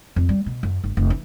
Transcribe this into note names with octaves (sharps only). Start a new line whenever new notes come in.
F2
G3
B2
F#2
G1
F1
E3